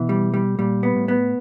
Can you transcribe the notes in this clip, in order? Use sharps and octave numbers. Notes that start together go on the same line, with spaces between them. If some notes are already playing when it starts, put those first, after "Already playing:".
Already playing: B2 E3
G3
G3
A#2 G3
B3
A2
B3